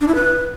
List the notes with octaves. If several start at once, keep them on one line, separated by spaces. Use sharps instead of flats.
D4
E4
B4